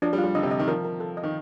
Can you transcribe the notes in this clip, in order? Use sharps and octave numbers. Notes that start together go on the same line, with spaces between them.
F3 D4
G3
F4
G3
D3 D#5
C3
D#5
D#3
F3 A#4
A#4
A4
D#5
D#3